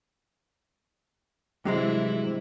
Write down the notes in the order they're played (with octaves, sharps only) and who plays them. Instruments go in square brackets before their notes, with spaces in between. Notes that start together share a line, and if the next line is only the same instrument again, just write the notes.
[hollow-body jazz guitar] G2 F#3 G#3 [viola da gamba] C3 E3 E4